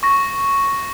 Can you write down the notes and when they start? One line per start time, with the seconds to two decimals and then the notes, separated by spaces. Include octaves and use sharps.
0.03 C#6 A#6